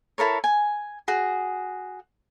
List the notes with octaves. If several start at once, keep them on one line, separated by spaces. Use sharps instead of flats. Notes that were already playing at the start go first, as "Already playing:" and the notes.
E4 A4 A#4 C#5
G#5
F#4 G#4